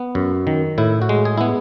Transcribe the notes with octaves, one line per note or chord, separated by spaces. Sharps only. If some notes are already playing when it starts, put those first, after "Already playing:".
Already playing: B3
F#2
D#3
A2 E4
F#4
G#3
G#4
B3 E4